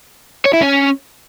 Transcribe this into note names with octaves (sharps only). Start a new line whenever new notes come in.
C#5
E4
C#4